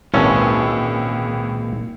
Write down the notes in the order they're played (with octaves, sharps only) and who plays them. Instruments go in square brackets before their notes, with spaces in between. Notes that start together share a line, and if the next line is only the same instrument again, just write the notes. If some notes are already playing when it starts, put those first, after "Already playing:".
[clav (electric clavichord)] G#1 E3 A5 [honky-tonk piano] C#2 E6 [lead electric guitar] A#2 [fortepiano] C#4